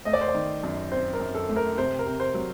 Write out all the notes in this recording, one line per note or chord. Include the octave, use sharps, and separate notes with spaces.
A3 D#5
D5
C5
D5
D#3
F#2
C4 C5
A#4
F#2
A4
A3
A#4
C3 C5
A#4
C3
C5
F#3